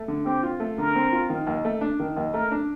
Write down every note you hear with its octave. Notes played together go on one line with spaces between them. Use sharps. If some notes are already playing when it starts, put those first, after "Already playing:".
Already playing: A3
D3
C4 G4
F4
A3
D3 A#4
C4
F4
D#3
D#2
A3
D4
D#3
D#2
A3 A#4
D4